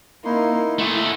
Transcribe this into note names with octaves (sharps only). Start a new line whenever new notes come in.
A#3 D#4 E4 C6
A3 E4 G#4 F#5 C6 C#6